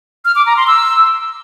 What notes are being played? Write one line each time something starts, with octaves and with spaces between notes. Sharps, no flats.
F6
D6
A#5
C6
E6